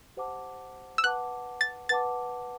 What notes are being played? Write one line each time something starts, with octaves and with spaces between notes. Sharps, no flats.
G4 C5 F#5 A5 D6
E6
B4 F#5 A5 D6 F#6
A6
B4 F#5 A5 D6 A6